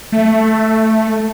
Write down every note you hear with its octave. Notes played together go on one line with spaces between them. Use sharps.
A3